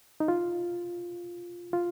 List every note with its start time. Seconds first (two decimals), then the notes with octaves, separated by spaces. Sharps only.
0.20 D#4
0.28 F4
1.73 F4